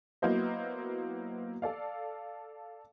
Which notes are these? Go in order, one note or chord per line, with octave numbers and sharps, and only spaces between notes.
F#3 A#3 B3 E4 C5 D#5
A4 D5 F5